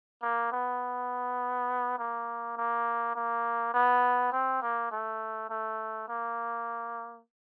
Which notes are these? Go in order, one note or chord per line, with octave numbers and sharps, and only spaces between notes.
A#3
B3
A#3
A#3
A#3
B3
C4
A#3
A3
A3
A#3